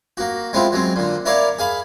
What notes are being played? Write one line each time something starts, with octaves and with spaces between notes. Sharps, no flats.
A#3 F#4
G#3 B3 C4 E4 F4
F#3 G#3 C4
A#2 D3
E4 A#4 C#5 D5 F5
G#4 F5 B5